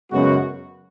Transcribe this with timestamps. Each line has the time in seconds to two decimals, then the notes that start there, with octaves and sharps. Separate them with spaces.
0.10 F#2 C#3 G#3 B3 F#4